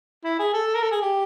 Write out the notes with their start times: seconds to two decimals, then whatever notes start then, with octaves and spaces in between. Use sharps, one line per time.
0.24 E4
0.39 G#4
0.53 A4
0.75 A#4
0.82 A4
0.91 G#4
1.02 G4